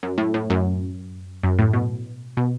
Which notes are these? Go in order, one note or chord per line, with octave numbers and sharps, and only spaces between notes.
F#2
A2
A2
F#2
F#2
A2
B2
B2